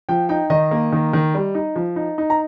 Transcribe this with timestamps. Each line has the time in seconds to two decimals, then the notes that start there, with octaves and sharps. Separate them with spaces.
0.09 F3 G5
0.29 D#4 G5
0.50 D#3 D#5
0.71 A#3
0.92 D#3
1.13 D#3
1.34 G3
1.55 D#4
1.76 F3
1.96 D#4
2.18 D#4
2.30 A#5